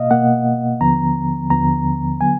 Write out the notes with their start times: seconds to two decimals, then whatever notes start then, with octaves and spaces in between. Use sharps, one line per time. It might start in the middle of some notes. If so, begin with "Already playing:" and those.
Already playing: B2 A#3 D#5 F5
0.11 B2 A#3 F#5
0.81 D#2 D3 F3 B3 A#5
1.50 D#2 D3 F3 B3 A#5
2.21 D3 F#3 B3 G#5